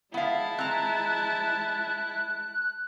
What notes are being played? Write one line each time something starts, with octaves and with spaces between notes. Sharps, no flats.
G#3 B3 E4 F5 A5
C4 A#5 F#6